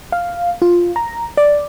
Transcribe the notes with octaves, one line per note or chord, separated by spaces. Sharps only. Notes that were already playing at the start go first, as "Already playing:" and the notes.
F5
F4
A#5
D5